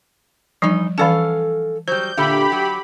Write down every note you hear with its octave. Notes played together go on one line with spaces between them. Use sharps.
E3 F3 G3 D#4
E3 C#4 A4 D5 F5 A5
F#3 G3 C5 G6
A#2 D3 G4 E5 B5
F#3